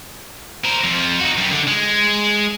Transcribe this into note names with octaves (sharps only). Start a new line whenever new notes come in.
A#4 C5
F2 F3
D#4 F#4
F#2 G3
D3
G#3